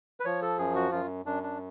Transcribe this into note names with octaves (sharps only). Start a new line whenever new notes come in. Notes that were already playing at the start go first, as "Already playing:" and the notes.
B4
F3 C#5
A4
F#2 G#4
F#4
F#2 F4
F#2 D4
D4